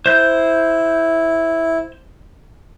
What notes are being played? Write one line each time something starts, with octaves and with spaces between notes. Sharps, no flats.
E4 C5 G6